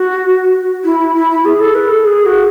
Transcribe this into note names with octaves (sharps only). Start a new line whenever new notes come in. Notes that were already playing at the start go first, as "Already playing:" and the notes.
Already playing: F#4
E4
E4
E4
E4
G#4
A4
B4
A4
G#4
F#4